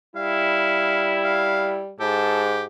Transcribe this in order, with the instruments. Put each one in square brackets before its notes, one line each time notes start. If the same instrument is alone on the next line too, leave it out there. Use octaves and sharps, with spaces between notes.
[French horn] G3 [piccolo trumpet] E4 [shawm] F5
[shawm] F5
[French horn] G#2 [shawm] G4 [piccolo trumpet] A4